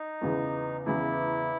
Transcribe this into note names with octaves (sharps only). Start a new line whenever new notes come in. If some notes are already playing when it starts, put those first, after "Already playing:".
Already playing: D#4
E2 C#3 E3
E2 C#3 E3 E4